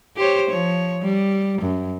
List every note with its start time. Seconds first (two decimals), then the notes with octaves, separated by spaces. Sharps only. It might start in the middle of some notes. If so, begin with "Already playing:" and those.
0.17 G4 C5 C#5
0.50 F3 C#5
1.03 G3
1.62 F#2